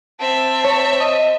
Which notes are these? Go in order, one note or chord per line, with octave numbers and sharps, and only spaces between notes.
C4 E5 A5
C#5
D#5